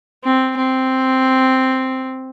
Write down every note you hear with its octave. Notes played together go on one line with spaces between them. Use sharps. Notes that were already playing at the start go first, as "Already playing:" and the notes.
C4
C4